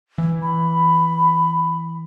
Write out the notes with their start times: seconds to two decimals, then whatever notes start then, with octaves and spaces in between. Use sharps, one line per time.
0.18 E3
0.43 B5